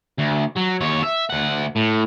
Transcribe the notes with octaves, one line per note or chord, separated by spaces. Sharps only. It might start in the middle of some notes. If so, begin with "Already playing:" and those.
D2
F#3
D#2 C#5
E5
D2 F#5
A2